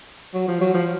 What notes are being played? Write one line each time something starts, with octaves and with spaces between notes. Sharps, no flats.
F#3
F3
F#3
F3